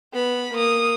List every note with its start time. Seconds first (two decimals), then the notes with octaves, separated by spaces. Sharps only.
0.13 B3 B5
0.54 A#3 D#6